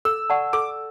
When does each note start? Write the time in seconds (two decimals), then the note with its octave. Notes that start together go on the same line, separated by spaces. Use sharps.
0.05 A4 E6
0.30 D5 F#5 A5 C#6
0.53 A4 D6